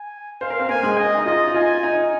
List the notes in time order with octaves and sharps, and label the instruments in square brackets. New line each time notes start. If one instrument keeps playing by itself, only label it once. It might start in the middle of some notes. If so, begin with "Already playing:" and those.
Already playing: [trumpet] G#5
[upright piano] C5 [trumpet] F5
[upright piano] A#4
C4 C5
[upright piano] A#3 A#4 [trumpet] G#5
[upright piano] G#3 G#4
[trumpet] D#5
[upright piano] D#4
[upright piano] F4 [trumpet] D#5
[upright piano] D#4
[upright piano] F4 [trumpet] G#5
[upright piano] D#4